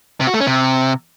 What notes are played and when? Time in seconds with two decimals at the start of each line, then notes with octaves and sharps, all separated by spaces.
0.21 C3
0.27 F#4
0.34 A3
0.40 C#4
0.47 C3